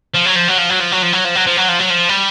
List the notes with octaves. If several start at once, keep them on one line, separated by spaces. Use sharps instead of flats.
F3
F#3
F3
F#3
F3
F#3
F3
F#3
F3
F#3
F3
F#3
F3
F#3
F3
F#3
F3
G3